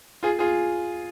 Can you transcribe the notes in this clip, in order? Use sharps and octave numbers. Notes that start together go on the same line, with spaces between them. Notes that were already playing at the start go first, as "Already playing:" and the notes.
F4 G#4
F4 G#4